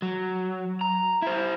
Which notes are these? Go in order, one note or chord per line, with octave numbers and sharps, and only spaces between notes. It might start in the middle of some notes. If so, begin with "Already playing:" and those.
F#3
A#5
E4 C5